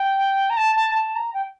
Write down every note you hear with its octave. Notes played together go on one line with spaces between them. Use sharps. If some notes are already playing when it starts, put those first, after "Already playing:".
Already playing: G5
A#5
A5
A5
A5
A#5
G5